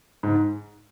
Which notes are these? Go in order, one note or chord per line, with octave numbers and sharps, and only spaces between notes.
G#2